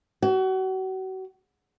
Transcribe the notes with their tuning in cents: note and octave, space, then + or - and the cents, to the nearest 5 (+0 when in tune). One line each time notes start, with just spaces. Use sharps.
F#4 +35